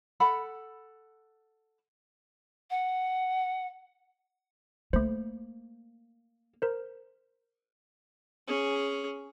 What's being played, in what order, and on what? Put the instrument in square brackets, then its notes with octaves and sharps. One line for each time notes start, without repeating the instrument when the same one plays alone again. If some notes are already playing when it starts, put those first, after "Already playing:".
[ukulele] A4 F#5 B5
[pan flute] F#5
[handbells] A3 C5 [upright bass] A#3
[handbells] A#4 C5
[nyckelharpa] C#4 G#4